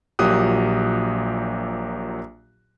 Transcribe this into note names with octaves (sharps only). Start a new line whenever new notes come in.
A#1 A#2 F#3 G4 D#6 F#6